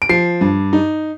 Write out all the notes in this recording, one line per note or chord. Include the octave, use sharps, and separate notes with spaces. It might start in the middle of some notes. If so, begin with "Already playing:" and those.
D7
F3 C7
G2
D#4